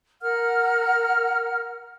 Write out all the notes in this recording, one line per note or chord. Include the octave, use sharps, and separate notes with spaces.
A#4 F#5 F6